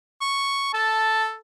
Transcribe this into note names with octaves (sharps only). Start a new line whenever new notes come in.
C#6
A4 A5